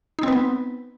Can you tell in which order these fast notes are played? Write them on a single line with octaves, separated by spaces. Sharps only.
D#4 C4 B4 B3